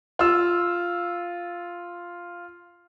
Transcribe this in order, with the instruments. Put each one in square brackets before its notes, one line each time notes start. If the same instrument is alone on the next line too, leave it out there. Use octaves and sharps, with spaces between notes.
[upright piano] F4 E6